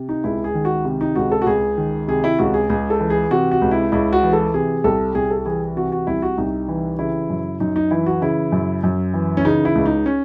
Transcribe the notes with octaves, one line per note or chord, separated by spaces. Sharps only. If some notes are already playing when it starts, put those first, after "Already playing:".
Already playing: C3
D#4
C#2 E4
G#4
D#3
F#4
C3
D#4
C#2 F#4
A4
F#4
C#2 G#4
D#3
C3 G#4
E4
C#2 F#4
G#4
C#2 G#4
A4
E3
G#4
C3 F#4
F#4
C#2
E4
C#2 E4
F#4
E3
A4
C3 G#4
C2 A4
C2 G#4
A4
E3 G#4
C3 F#4
F#4
C2 E4
F#4
C2 D#4
E3
C#3 E4
F#2
F#2 D#4
D#4
E3 E4
F#4
C#3 E4
F#2
F#2
E3
C#4
C#3 D#4
E4
C#2
D#4
C#4